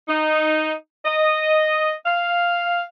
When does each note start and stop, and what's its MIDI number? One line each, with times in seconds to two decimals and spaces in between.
0.08 0.72 63
1.05 1.93 75
2.06 2.82 77